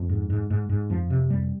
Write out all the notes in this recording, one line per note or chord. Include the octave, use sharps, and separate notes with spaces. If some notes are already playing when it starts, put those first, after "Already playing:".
Already playing: F2
G#2
G#2
G#2
G#2
F2 F3
C3
F2 G3